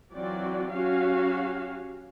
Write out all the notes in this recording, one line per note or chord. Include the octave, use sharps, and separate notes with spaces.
E3 F#3 C4 F4 F#4 D5
F#3 C#4 F#4 G4 F5